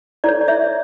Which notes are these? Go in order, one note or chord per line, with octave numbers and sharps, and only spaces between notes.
E4 A4 C#5 D5
D5
C#5 E5